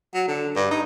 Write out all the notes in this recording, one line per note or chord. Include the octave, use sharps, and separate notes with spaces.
F#3
D3
G2
D#4